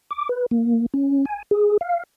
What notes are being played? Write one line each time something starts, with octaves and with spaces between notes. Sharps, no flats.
D6
B4
A#3
C#4
G#5
G#4
F5